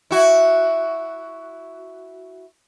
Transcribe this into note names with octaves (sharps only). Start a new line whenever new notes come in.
E4 F#4